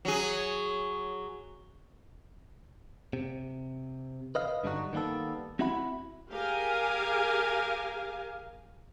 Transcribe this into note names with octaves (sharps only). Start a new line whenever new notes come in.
F#3 G#4
C3
B4 D#5 F5
G2 D3 G3 D4 D#4 F#4
D#3 G3 A#3 B3 A4
C4 E4 F#4 E5 F#5 B5
G4 G#4 A#4 F5 G#5